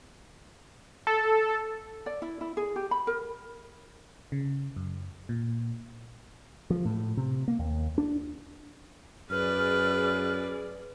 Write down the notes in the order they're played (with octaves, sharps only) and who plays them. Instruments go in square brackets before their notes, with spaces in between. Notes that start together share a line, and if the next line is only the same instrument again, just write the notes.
[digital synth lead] A4
[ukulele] D5
E4
E4
G#4
G4
B5
A#4
[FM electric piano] C#3
F#2
A#2
[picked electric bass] F3
A2
C3
A#3
D#2
D4
[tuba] F#2 [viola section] G#4 D5 [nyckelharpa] B4 [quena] F6